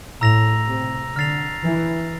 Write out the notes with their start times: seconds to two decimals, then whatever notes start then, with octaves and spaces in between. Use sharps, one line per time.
0.21 A2 A#5 E6 A#6 F7
0.68 C3
1.16 D3 F6 A6 C7 F7
1.65 E3